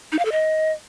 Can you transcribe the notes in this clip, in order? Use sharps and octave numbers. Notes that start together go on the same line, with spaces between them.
D#4
F5
A4
D#5